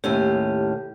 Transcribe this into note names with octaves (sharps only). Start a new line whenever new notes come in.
D#2 A2 C#4 G4